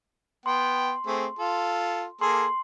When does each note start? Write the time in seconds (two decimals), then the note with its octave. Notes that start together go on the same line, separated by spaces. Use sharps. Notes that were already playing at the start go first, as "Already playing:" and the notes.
0.46 B3 G5 C6
1.07 A3 C4 G#4
1.39 F4 A4
2.21 A#3 G#4 A4 C6